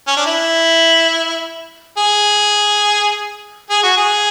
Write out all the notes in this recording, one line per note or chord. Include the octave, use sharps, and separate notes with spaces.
C#4
D4
E4
G#4
G#4
F#4
G#4